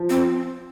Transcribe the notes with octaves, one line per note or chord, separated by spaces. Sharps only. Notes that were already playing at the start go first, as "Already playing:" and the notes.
Already playing: F3
C4